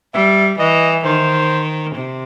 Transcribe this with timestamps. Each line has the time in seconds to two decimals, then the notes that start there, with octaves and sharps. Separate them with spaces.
0.13 G3 E5
0.59 E3 D#5
1.04 D#3 C5
1.95 C3